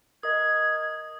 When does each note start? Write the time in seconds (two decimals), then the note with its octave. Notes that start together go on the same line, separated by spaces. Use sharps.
0.23 A#4 D#5 D#6 G#6